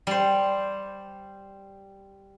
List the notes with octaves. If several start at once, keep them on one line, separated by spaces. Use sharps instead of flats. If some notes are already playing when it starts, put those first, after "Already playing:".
G3 C5